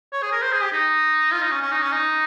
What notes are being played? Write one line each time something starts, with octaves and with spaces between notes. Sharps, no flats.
C#5
G#4
A#4
C5
G#4
G4
D#4
F4
D#4
C#4
C#4
D#4
C#4
D#4